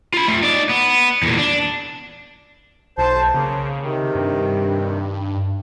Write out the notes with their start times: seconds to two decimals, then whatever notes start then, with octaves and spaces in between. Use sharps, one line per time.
0.14 F4 B5
0.27 A3 F4
0.43 D#4 D5
0.69 B3
1.23 E2 A#2
1.38 D4
2.98 B1 C5 A5
3.34 C#3 A#3
3.81 C3 D#3
4.15 G2